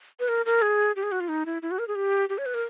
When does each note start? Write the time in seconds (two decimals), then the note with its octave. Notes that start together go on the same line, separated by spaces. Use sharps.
0.20 B4
0.29 A#4
0.46 A#4
0.62 G#4
0.96 G4
1.03 G#4
1.12 F#4
1.20 F4
1.29 D#4
1.46 E4
1.62 E4
1.71 F#4
1.79 A#4
1.88 G#4
1.95 G4
2.29 G4
2.38 C#5
2.46 B4
2.54 A#4